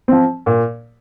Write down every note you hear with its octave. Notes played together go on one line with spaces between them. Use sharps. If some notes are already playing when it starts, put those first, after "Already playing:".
F3 C4
A#2